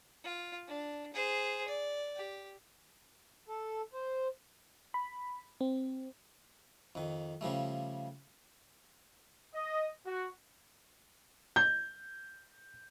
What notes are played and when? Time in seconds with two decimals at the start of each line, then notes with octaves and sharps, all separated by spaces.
0.24 F4
0.68 D4
1.14 G#4 C5
1.67 D5
2.17 G4
3.49 A4
3.93 C5
4.94 B5
5.61 C4
6.95 F2 D#3
7.41 C#3 F3 G3 A3
9.54 D#5
10.06 F#4
11.56 G6